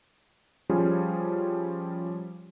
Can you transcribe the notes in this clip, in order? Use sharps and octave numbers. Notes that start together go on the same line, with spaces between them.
F3 G3 C#4 F4 G#4